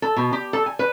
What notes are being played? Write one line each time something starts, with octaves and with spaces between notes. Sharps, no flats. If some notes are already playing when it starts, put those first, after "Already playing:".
A4
B2
G4
A4
G#5
B4